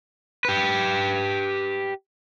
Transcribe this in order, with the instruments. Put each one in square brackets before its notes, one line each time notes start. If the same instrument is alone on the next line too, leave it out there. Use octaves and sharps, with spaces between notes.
[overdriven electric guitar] G4 B4